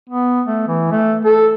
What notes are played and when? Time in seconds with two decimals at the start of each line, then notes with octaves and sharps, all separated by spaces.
0.10 B3
0.47 A3
0.68 E3
0.91 A3
1.25 A4